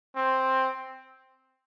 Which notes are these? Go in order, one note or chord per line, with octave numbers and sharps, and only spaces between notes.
C4